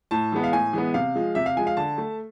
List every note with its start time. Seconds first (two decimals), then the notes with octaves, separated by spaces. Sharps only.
0.11 A2 A5
0.32 E3 G#3 B3
0.44 F5
0.52 A2 G#5
0.73 E3 G#3 B3
0.94 C3 F5
1.15 F3 G#3
1.35 C3 E5
1.46 F5
1.56 F3 G#3 G#5
1.67 F5
1.77 D3 A5
1.98 A3